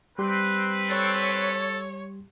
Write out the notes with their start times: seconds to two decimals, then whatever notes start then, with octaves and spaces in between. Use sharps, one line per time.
0.19 G3 C4 G4 B4 C6
0.90 A4 C#5